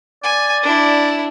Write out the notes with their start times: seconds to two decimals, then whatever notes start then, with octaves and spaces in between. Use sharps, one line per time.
0.23 D5 G#5
0.63 D4 E4